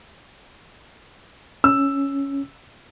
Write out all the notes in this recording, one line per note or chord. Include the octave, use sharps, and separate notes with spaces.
C#4 E6